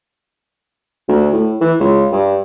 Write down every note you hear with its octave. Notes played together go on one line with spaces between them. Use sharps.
D2
A2
E3
C#2
G2